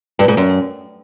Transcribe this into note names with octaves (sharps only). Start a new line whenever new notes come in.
G2
G#2
F#2